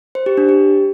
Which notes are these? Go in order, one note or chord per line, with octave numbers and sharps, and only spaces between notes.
C5
G4
D4
G4